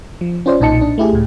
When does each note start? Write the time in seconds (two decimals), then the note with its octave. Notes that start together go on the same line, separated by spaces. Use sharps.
0.21 F3
0.46 C#4 F4 C5 D5
0.60 B1 A#2 D#4 D#5 A5 C#7
0.81 D4
0.98 A3 E4 G4 G#4
1.12 C#2 A2